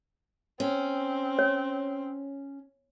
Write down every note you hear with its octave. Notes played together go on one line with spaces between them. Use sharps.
C4 C#4
C#5